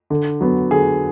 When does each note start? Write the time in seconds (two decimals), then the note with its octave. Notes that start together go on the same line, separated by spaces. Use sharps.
0.10 D3
0.41 F#3 B3
0.71 D3 G#4